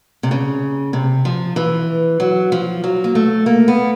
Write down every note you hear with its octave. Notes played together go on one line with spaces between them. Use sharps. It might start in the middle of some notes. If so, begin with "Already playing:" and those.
C3
C#3
C3
F3
E3
F#3
F3
F#3
A#3
A3
A#3
B3